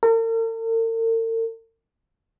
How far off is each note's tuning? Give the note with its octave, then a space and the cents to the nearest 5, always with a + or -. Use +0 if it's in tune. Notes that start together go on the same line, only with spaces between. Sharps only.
A#4 -45